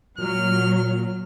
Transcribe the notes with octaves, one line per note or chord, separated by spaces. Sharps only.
A#2 F#3 F6